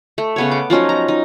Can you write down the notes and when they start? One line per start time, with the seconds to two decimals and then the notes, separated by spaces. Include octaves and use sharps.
0.18 A3
0.36 C#3 B3 C#5
0.51 D6
0.70 F3 F#3 C#4 D#4
0.89 A#5
1.08 D#4